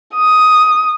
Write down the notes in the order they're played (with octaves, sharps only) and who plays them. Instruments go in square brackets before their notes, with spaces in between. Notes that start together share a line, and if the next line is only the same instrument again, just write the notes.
[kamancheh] D#6